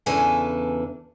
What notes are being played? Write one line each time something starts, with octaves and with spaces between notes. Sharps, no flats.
E2 C#3 E3 D4 A4 G#5